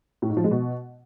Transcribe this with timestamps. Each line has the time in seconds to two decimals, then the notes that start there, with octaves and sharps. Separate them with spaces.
0.22 A2
0.29 G#2
0.37 F3
0.44 G#3
0.51 B2